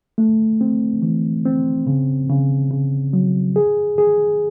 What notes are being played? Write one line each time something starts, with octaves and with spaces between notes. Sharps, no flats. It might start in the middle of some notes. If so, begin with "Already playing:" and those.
A3
C4
E3
C4
C#3
C#3
C#3
F#3
G#4
G#4